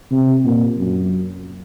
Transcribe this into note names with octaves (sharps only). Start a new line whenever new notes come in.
C3
A#2
F#2